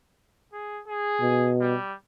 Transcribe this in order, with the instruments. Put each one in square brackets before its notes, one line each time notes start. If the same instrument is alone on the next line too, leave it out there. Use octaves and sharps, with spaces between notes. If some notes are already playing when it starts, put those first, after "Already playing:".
[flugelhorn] G#4
G#4
[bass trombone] B2
[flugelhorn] G3